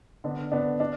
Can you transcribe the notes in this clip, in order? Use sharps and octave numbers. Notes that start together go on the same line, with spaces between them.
D3 B3 D4
D3 B3 D4
D4